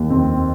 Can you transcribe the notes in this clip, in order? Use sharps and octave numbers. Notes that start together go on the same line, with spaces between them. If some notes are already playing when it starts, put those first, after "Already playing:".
Already playing: D#2
F2 C4